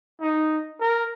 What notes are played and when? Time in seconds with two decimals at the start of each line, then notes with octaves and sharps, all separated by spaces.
0.21 D#4
0.80 A#4